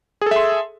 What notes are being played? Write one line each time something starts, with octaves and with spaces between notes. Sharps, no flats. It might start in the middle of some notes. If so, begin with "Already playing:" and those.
G#4 A4 E5 C6